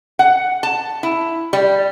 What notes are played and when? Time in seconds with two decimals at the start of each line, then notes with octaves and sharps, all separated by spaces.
0.19 F#5
0.63 A5
1.03 E4
1.53 G3